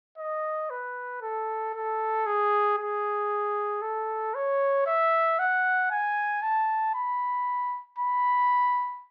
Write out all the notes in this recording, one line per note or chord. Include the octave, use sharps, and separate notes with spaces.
D#5
B4
A4
A4
G#4
G#4
A4
C#5
E5
F#5
G#5
A5
B5
B5